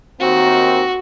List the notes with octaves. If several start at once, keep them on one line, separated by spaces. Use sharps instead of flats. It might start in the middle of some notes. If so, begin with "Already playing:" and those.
D#2 D#3 C4 F#4